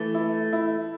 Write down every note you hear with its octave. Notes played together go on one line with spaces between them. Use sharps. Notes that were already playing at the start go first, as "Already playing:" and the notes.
Already playing: E3 A3
E4
E4